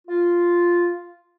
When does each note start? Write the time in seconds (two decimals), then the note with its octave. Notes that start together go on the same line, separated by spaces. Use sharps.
0.07 F4